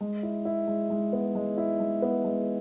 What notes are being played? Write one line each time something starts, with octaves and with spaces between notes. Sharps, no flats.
G#3
E4
E4
G#3
G#3
B3
G#3
E4
G#3
B3
G#3